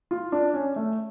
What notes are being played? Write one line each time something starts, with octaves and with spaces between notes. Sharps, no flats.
F4
D4
C#4
A3